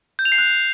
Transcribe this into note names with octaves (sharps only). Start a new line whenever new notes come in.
G6
F7
C7
F#6